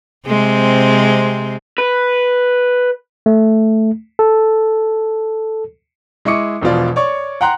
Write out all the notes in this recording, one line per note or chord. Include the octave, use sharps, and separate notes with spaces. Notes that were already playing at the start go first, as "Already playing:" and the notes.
C3 G#3 C4
B4
A3
A4
G#3 E4 D#5 C#6 D6 C#7
E1 B2 F3 F4 D5
C#5 D5 C#6
F#5 G5 A#5 C6 F#6